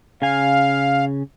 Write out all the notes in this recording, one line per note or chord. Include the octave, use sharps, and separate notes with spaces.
C#3 F5 G#5